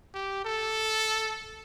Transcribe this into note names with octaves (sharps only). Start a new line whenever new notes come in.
G4
A4